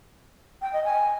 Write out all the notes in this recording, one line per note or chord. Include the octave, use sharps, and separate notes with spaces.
G5
D#5
G#5